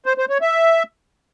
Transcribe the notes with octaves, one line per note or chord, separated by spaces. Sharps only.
C5
C5
C#5
E5